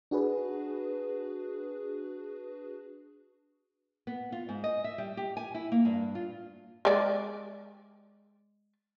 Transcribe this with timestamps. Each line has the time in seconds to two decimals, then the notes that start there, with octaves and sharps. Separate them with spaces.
0.11 D4 F#4 G#4 B4
4.07 B3
4.32 F4
4.49 G#2
4.64 D#5
4.84 E5
4.98 G3
5.17 G4
5.37 G#5
5.54 E4
5.72 A#3
5.85 G2
6.15 F4
6.85 G#3 D5